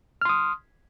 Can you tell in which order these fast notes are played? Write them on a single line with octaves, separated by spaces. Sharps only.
F6 C6 D#6